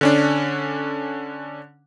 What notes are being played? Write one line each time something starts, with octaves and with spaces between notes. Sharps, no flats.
D3 C#4 D4